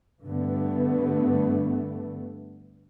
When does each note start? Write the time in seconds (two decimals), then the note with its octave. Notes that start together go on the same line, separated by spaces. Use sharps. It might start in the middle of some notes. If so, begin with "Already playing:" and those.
0.24 G2 D3 A3 B3